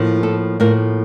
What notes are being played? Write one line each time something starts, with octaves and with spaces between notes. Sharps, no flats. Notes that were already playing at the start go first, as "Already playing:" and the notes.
Already playing: A2 F3 A#3
A4
A2 F3 A#3 A#4